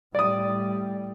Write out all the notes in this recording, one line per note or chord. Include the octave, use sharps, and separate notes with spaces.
A2 G3 D5 D#6